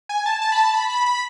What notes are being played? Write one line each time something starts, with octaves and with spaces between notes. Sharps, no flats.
G#5
A5
A5
B5
A5
B5
B5
B5